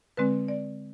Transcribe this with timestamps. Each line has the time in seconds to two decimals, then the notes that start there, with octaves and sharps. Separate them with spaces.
0.17 D3 G#3 C4 B4
0.48 D5